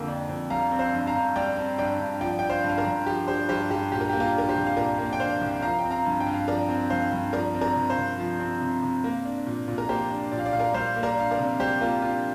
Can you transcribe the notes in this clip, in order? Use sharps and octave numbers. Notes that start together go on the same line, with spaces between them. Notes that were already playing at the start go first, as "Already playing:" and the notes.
Already playing: F2 D3 A#3 G5
D4
F2
G3 F5 A#5
C4
C5 F5
G2
F5 A#5
G2
G3 D5 G5
C4
G2 D5 G5
G2
F3 D5 G5
D4 G5
C5 F5
G2 F5
A#4 D5
G2
F3 G4
D4 G4 C5
G2 G4 C5
G2 G4
A#2 G4
A#4
A#3 G4
F4 A#4
D4 A#4
G4 C5
C2
F5
A#2 A#4 D5
A#3
G5
D4 C5 F5
C2
F3 F5 A#5
G5
C4
F5 A#5
G2
G5
G2
F5
F3 A#4 D5
C4
G2 C5 F5
G2
F3 A#4 D5
C4
A#4 D5
C3
C5 F5
C3
F3
C4
C3
C3
A#3
D4
A#2
A#2
A#4
A#3 G4 C5
D4
A#2 D5
F5
D5
A#2 F5
A#4 D5
G3 C5 F5
A#3
A#4 D5
D4 F5
A#4 D5
C3
G3 G4 C5
A#3 F4 A#4
D4 F4